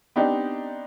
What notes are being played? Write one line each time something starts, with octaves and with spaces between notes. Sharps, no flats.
B3 C4 D4 D#4 G4